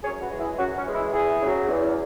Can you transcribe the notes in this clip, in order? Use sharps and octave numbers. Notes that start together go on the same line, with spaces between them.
F#2 G#4 C#5
F#4 B4
E3 G#3
E4 G#4
F#2 C#4 F#4
C#4
E3 G#3
E4
E2 E4 G#4
C#3 F#3
E2